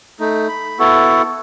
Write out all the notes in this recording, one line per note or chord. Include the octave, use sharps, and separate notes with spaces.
A3 D#4
B5
B3 E4 F#4 A4